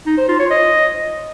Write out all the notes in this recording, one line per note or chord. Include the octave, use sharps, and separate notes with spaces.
D#4
C5
F4
C#5
D#5